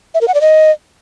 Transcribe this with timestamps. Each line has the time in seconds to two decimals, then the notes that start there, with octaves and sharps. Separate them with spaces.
0.14 E5
0.21 A#4
0.28 F#5
0.34 D5
0.41 D#5